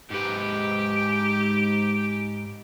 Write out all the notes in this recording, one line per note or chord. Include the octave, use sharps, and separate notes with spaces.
G#2 G4 B4 D7